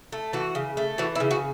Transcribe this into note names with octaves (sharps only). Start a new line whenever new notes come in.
A3
E3 F#4
C#3
A3
E3 F#4
E4
C#3
F#4